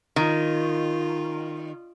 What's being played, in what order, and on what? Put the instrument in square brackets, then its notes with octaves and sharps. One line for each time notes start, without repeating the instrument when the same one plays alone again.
[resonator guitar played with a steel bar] D#3 [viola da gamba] F4